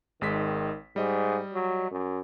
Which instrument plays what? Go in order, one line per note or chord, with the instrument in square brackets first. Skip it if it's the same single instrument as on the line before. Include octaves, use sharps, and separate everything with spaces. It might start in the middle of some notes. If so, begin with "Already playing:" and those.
[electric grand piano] G#1 G#3 B6 [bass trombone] D#3
[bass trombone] G#2 [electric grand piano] G3 D#5
[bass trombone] F#3
F#2